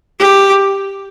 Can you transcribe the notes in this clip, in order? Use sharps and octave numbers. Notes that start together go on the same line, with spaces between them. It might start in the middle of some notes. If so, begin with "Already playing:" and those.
G4